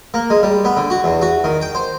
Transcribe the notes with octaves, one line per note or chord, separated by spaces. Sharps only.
A#3
G#3
G3
B3
D3
F#4
E2
F#4
D#3
G5
C5